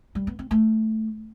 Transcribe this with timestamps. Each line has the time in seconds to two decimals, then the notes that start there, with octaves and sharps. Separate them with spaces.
0.15 G3
0.27 B3
0.39 C4
0.51 A3